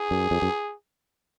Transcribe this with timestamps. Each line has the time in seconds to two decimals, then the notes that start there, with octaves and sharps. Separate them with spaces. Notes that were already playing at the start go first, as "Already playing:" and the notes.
Already playing: G#4
0.11 F#2
0.31 F2
0.42 F#2